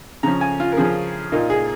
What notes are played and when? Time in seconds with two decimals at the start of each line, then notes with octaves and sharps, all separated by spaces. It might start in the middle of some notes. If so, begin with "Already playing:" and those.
0.23 C#3 F3 C#4 A#5
0.41 G#5
0.60 F4
0.72 A#4
0.77 C#3 F3 C#4 G#4
1.32 A#2 A#3 D#4 F4
1.50 G#4